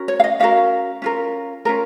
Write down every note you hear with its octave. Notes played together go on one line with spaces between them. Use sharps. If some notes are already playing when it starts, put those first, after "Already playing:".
Already playing: C#4 F#4 A#4
C#5
F5
D#5
C#4 F#4 A#4 F5
C#4 F4 A#4
C#4 F4 A#4